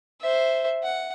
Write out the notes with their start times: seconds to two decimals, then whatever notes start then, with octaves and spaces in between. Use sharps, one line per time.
0.21 C5 E5
0.83 F#5